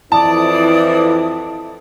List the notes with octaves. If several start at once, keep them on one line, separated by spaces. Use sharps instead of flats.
F2 E3 E4 D5 A5 D#6